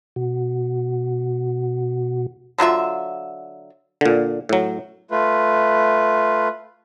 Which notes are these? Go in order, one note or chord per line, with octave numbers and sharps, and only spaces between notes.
B2 F#4
D3 F#3 F4 E5
A#2 D3
A2 F#3
A3 F4 B4